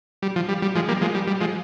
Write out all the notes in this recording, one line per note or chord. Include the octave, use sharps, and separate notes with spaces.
G3
F3
G3
G3
F3 G#3
G3 A#3
F3 G#3
G3
G3
F3 G#3